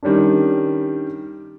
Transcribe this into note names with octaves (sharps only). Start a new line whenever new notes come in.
D#3 G3 C#4 D4